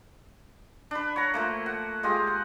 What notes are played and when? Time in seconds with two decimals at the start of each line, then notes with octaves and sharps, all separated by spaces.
0.91 D4 B4
1.16 C#5 F#5 A#5
1.34 F3 A3 A#3
1.66 F#5
2.03 G#3 F4 G4 D#5
2.27 F#5